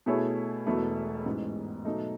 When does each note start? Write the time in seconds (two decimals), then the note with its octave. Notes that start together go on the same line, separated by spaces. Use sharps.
0.06 B2 A3 E4 G#4 C#5
0.66 E1 E2 B2 A3 E4
1.26 A1 G#2 E3
1.85 B2 F#3 A3 D#4